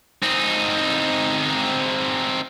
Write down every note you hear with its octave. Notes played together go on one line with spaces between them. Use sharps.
C4 D#4